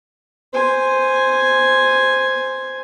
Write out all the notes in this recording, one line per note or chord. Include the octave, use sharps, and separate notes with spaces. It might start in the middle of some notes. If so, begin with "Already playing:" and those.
C5 G#5